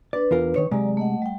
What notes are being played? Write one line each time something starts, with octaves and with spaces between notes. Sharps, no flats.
D4 B4 D5
E2 F4 A#4
D#3 C#5
C3 F#3 G#3 D5 A#5
A3 D#5 F#5
G3 G5